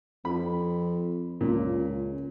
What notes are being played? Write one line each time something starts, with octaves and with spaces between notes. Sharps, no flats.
F2 B5
C#2 A#2